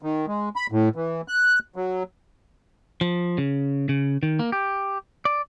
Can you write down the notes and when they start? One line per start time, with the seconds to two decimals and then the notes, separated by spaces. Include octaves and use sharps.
0.02 D#3
0.27 G#3
0.56 B5
0.72 A2
0.96 E3
1.28 F#6
1.76 F#3
3.01 F3
3.38 C#3
3.89 C#3
4.23 D#3
4.39 A#3
4.52 G4
5.25 D5